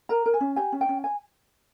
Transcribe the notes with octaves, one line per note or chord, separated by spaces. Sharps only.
A#4 A#5
A#4
G#5
C#4
G4 G#5
C#4
G5
C#4
G#5